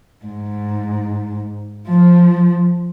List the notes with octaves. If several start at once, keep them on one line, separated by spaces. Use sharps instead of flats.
G#2
F3